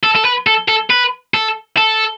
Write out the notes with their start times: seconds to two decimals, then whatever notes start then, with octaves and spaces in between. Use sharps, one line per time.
0.03 A4
0.15 A4
0.25 B4
0.47 A4
0.68 A4
0.90 B4
1.34 A4
1.77 A4